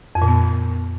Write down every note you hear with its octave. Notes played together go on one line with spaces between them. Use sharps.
F2
A#2
B3